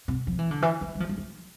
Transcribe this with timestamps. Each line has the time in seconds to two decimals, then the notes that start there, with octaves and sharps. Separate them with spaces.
0.08 C3
0.27 F3
0.39 E3
0.51 D3
0.62 E3
0.81 F3
0.95 G3
1.00 F3
1.09 G3
1.18 F3